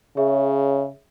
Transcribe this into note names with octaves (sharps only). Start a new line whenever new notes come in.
C#3 G#4 C#5 E5